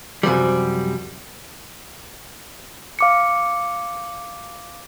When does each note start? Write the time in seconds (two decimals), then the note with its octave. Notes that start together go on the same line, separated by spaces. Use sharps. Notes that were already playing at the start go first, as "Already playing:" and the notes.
0.23 F#2 C3 F3 G3
2.99 F5 D6 C#7